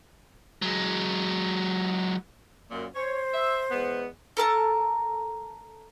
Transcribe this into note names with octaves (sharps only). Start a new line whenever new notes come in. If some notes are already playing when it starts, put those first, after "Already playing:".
F#3 G#3
F#2 A#2
C5 C#5
E5
E2 G#3 B3
A4 A#4 A5 A#5